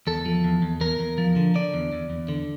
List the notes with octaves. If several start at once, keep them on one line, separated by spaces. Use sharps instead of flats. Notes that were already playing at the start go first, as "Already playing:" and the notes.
E2 A4
F3
E2
E2
E2 A#4
E2
F3
D3
D3 D5
E2
E2
E2
D3